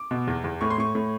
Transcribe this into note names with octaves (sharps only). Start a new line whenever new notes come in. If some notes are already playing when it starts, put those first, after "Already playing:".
Already playing: D6
B2
E2
E2
A2 C#6
C6
A2 C#6
A2